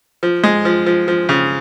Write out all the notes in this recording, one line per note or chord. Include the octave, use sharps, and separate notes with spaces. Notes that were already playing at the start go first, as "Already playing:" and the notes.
F3
G#3
F3
F3
F3
C#3